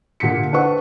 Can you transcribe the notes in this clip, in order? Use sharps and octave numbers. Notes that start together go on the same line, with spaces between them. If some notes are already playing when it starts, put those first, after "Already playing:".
A#2 D3 G4 B6 C#7
D4 B4 C5 F#5 C#6